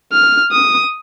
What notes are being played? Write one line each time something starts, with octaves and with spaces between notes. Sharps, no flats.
F6
D#6